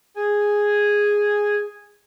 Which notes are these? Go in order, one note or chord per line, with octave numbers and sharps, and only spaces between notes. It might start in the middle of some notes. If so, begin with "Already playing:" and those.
G#4 G#5